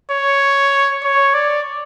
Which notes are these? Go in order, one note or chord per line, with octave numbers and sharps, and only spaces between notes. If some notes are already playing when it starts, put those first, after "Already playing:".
C#5
C#5
D5